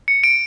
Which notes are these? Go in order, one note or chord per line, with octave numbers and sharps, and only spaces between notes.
C#7
D7